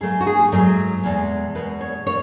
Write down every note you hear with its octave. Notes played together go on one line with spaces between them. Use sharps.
G#2 F#3 A3 G#4
F#4
G#4
G#2 F#3 A3
E2 B2 G#3
E2 B2 G#3 B4
C#5
A2 C#5